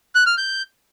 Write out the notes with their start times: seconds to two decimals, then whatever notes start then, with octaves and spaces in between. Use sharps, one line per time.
0.15 F#6
0.26 F6
0.38 G6